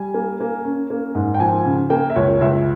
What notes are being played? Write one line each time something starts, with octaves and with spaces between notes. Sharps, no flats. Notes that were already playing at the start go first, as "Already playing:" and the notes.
Already playing: G3 G#5
A#3
A#3
C#4
A#3
G#2
G5
F3 G#5
C#3
A#3 G5
E5
C#2 C#5
C#2 E5